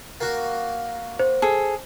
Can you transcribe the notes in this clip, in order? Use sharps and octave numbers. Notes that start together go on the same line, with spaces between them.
A#3 F#4
C5
G#4 A4